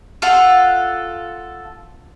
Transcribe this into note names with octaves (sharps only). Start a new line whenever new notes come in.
F4 A4 F5 F#5